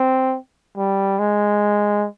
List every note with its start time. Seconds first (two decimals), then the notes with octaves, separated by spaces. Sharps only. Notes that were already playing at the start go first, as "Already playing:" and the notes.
Already playing: C4
0.77 G3
1.19 G#3